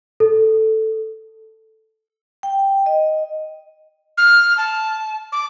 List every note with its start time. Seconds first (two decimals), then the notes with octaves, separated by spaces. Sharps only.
0.20 A4
2.43 G5
2.86 D#5
4.18 F6
4.57 A5
5.32 D6